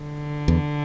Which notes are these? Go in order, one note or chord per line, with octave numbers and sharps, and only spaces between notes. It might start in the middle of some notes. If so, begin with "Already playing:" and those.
Already playing: D3
E2